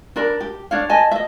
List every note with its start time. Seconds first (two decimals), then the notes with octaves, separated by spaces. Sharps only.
0.16 D4 A#4 B5
0.40 G4
0.71 D4 C#5 F5
0.89 D#5 G#5 A5
1.11 D#5 E5